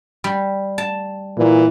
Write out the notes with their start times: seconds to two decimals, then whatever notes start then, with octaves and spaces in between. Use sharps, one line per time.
0.24 G3
0.78 A5
1.37 A#2 E3 E4